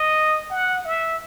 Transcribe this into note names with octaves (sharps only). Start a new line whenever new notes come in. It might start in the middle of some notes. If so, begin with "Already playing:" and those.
Already playing: D#5
F#5
E5